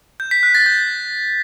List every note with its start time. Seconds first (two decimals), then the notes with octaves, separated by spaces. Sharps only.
0.20 G6
0.31 B6
0.43 F#6
0.55 A6
0.66 G6